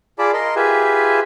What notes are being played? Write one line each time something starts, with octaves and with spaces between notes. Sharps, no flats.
F4 G#4 D5 A5 B5 D6
A#4 D#5 C6
F4 G4 G#4 B4 E5 G#5